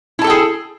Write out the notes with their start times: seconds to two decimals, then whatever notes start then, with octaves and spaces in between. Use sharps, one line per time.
0.19 E4
0.22 A5
0.24 A4
0.27 G5
0.30 G#4